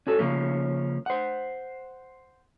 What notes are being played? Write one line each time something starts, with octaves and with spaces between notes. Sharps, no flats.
C#4 F#4 A4
C#3 F3 A#3 C#4
C5 F#5